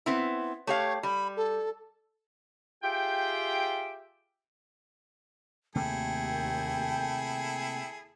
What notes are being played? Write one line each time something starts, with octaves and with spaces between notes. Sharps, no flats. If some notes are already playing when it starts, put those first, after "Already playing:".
B3 C4 E4
A3 G4 C#5 F5
G3 B5
A4
F4 G4 G#4 E5 G5
D#2 C3 A3 A#3 E4 G#4 A4 G5